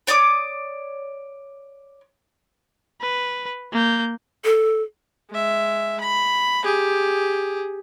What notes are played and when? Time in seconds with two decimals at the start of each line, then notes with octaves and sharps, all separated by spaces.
0.07 C#5 D5 D6 D#6
3.02 B4
3.72 A#3 G6
4.45 A4
5.30 G#3 E5
6.01 B5
6.64 G4 G#4